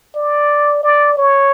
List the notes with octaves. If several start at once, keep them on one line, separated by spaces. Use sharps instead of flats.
D5
D5
C#5